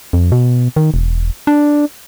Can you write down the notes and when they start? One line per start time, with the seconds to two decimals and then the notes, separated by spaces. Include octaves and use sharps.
0.13 F2
0.32 B2
0.76 D#3
0.94 E1
1.47 D4